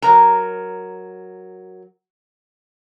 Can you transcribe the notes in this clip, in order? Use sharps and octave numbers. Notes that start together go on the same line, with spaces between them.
F#3 A#4 A#5